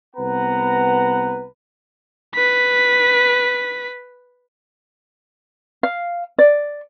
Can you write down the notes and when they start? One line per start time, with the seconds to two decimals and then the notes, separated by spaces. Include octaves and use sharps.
0.16 C2 B3 B4 F#5 A#5
2.35 B4 B6
5.83 F5
6.38 D5